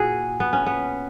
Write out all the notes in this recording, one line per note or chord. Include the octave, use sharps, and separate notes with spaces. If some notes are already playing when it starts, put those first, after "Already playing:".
Already playing: A#2 E4 F#4 G#4
B3
C#4
B3